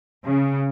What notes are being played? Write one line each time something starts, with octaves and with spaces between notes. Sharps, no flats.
C#3